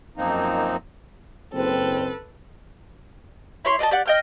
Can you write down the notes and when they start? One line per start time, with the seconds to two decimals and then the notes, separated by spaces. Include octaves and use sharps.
0.17 F#2 F3 A#3 C4 D#4
1.53 F#1 C4 A4 B4
3.65 E4 C#5 C6
3.79 D5 D#5 G5 A5
3.91 G4 D5 F#5
4.06 D#5 G5 F6